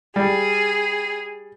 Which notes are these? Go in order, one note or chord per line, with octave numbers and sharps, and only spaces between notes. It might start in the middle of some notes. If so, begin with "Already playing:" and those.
G3 G#4